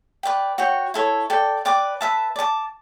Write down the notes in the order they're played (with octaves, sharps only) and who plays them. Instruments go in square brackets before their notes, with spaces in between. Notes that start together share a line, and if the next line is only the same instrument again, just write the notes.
[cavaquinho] B4 D5 G5
F#4 C#5 G5
E4 A4 C#5
A4 D5 G5
B4 D5 G5 D6
B4 E5 A5
D5
A5 D6